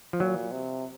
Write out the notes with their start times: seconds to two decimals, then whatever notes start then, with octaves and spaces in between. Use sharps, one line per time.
0.13 F3
0.20 A#2 F#3
0.52 C3